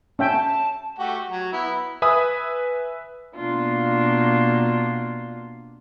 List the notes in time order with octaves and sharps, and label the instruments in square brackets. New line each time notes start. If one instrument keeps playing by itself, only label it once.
[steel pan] C#4 E5 G5 [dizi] A5
[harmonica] A3 F#4 G4
F#3
B3 E4
[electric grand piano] B4 E5 G#5 B5 D#6
[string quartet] B2 A#3 D4 F4